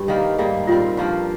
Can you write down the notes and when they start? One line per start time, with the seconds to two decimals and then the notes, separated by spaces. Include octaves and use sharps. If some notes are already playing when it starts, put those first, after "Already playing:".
Already playing: G2 G4
0.08 D#3 G3 A#3
0.38 G#2 G3 A#3
0.67 A#2 G3 C4 F4
0.97 G2 F3 A#3